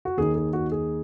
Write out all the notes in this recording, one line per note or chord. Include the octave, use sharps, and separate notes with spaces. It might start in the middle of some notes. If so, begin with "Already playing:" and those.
F#4
D#2 D#3 G#4
G#4
F#4
G#4